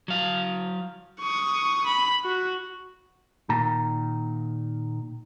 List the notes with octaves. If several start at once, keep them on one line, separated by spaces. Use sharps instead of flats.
F#3 F5
C#6 D#6
B5
F#4
A#2 D#3 A#5